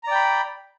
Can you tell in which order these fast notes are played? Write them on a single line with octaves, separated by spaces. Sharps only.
A#5 D5 G5 B5